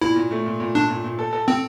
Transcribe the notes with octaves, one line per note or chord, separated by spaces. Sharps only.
A#2 E4
A#2
A3
A#2
A#2
A#2 D4
A#2
A#2
A4
A4
C4 A4